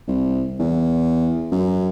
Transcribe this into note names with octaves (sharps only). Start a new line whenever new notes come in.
C2
E2
F#2